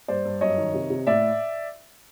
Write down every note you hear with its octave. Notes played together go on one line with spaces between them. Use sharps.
G2 C5 D5
G2
F#2 C#5 D#5
D#3
C3
C3
A2 D5 E5